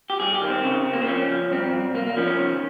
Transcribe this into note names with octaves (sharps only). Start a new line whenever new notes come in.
G4
G2 G#4
G4
D#3
C4
C#3
C#3
A#3
C4
F3 C#4
F3
G2 C4
G2
C2 A#3
A#3
F3 C#4
C#4
D#3